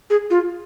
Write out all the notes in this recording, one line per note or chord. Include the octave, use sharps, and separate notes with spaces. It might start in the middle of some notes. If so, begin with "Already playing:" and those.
G#4
F4